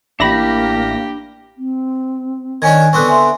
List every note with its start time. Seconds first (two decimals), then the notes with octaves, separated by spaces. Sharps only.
0.20 A1 A#3 D4 E4 G4 B5 A#6
1.58 C4
2.62 D#3 C#4 D4 G#5 G#6
2.93 D3 B3 C4 C#6 D6 F#6
3.09 E5 G#5 C6